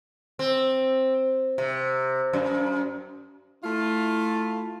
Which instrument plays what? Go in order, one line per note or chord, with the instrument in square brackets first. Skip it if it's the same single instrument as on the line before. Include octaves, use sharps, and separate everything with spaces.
[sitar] C4
C3
F#2
[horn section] A3 E4 F4